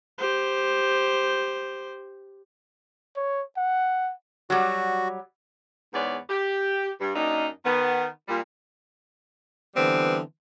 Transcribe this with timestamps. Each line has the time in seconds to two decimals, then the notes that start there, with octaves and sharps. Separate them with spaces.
0.18 G4 C5
3.17 C#5
3.57 F#5
4.50 F#3 G3 F#4
5.93 E2 G#2 B3 C#5 D5
6.29 G4
7.00 G2
7.15 F#2 A#3 D4 D#4
7.65 D#3 B3
8.29 A#2 G3
9.76 D3 E3 G3 B3 C4